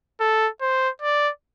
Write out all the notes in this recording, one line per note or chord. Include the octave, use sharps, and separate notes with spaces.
A4
C5
D5